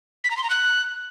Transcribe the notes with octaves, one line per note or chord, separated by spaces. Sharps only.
B6
A#5
C6
A#5
F#6